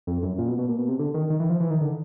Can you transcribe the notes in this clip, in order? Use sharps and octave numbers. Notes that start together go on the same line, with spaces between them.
F2
F#2
A#2
B2
B2
A#2
B2
C3
D3
D#3
D#3
E3
F3
E3
D#3
D3